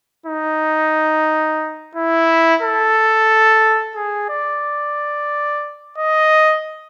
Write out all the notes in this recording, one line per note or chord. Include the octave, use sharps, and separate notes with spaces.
D#4
E4
A4
G#4
D5
D#5